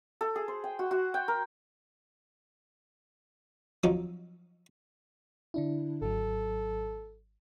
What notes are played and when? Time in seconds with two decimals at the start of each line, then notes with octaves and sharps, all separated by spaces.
0.21 A4
0.36 G#4
0.48 C5
0.64 G5
0.79 F#4
0.91 F#4
1.14 G5
1.28 A#4
3.84 F3 F#3 C4 D#4 F4
5.54 D3 D4 E4
6.02 G#1 F#3 A4